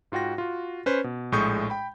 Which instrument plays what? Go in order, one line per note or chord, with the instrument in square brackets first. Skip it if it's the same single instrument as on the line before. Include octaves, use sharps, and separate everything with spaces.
[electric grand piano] G#2 F4 F#4 G5 A#6
F4 F#4
C#4 B4 C5
B2
A#1 A2 G#3 C#6 D#6 G6
G5 B5